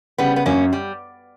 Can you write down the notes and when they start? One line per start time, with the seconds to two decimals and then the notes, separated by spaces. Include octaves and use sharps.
0.18 C#3 G3 B3
0.36 B3
0.46 F#2 A#3 C#4
0.73 G3